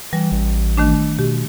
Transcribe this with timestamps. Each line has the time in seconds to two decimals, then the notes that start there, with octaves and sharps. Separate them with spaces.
0.13 E3 G3
0.32 A1
0.77 D#3 A3 D4
1.19 B2 G4